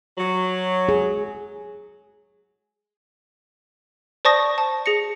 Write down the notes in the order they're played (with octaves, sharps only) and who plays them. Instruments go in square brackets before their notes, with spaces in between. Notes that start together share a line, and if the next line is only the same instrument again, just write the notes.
[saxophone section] F#3
[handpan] G#4
[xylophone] C5 D5 A5 C#6 D#6 A#6
A5
G#4 A#6 C#7